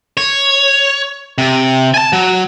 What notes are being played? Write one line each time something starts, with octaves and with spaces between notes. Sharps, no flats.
C#5
C3
G#5 A5
F#3